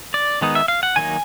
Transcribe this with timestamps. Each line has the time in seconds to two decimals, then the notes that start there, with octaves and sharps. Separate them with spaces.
0.14 D5
0.41 D#3 G#3 B3 D#4
0.55 E5
0.68 F5
0.83 F#5
0.96 D#3 F#3 A#3 D#4 G#5